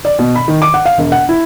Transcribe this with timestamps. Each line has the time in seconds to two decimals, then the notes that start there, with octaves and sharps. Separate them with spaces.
0.05 D5
0.19 B2
0.36 B5
0.48 D#3
0.62 D6
0.74 F#5
0.86 F5
0.98 E1
1.12 F#5
1.29 E4